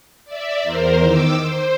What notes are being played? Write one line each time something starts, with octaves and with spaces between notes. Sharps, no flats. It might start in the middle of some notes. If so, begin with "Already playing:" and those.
D5 E5
E2 A#4 C5
D#3 D6 E6
C5